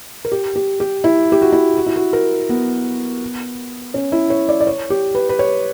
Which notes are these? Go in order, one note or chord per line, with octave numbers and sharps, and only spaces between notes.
A#4
G4
G4
G4
E4
G4
F#4
E4
F#4
E4
F#4
A#4
B3
C#4
E4
C#5
D5
D5
C#5
G4
B4
B4
C#5